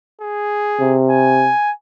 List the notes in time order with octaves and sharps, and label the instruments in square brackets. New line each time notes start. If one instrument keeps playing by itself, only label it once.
[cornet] G#4
[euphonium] C3
[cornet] G#5